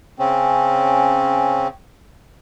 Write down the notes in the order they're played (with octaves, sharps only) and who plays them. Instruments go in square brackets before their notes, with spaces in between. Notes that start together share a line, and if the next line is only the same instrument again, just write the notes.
[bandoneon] C#3 C4 C#4